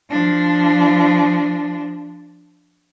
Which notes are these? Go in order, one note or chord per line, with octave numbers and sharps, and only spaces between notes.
F3 D4